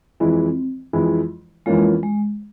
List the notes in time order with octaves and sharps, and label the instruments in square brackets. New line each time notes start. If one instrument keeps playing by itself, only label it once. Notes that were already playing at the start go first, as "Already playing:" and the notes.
[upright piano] F2 E3 G#3 E4 [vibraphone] C4
[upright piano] F2 E3 G#3 E4
[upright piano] F2 E3 A#3 C#4 F4 [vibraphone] G#3
[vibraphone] G#3